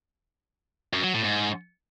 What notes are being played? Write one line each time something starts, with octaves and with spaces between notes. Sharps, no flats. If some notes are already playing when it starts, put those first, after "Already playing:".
F#2
F#3
A2
G#2